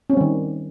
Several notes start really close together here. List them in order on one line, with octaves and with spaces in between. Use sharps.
C#4 C4 G3 D#3